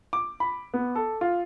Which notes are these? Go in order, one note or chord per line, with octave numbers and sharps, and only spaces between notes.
D6
B5
B3
A4
F4